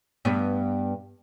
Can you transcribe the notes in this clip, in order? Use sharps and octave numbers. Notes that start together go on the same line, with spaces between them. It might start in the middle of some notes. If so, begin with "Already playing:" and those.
G2 B3